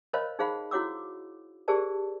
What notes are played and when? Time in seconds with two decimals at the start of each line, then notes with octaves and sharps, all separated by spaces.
0.13 A#4 C5 C#5 D#5 F5 B5
0.39 D#4 G#4 C5 F5 F#5 B5
0.71 E4 F#4 C#5 F#5 D6 E6
1.68 G4 G#4 A#4 C5 D5 A5